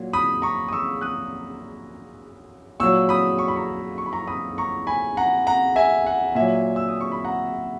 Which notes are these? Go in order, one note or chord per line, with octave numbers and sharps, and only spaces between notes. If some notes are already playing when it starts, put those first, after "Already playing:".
Already playing: A#2 F#3
B5 D#6
A#5 C#6
D#6
C#6 E6
D#6 F#6
A#2 F#3 C#6 E6
B5 D#6
C#6
B5
A#5 C#6
C#6
B5
A#5 C#6
B5 D#6
A#5 C#6
G#5 B5
F#5 A#5
F#5 A#5
E5 G#5
F#5
A#2 F#3 E5 G#5
E6
D#6
C#6
B5
F#5 A#5